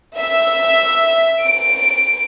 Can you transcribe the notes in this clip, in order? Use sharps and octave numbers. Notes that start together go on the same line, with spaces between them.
E5
D7